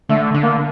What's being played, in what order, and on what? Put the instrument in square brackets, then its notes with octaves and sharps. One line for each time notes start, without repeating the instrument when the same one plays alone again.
[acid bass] D3 [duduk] A3
[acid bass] D3
[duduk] A#3